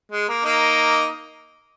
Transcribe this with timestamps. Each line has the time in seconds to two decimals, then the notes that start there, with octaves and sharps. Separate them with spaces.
0.12 G#3
0.28 A#3
0.44 A#3 D#4